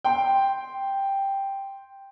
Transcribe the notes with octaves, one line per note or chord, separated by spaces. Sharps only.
G5 C6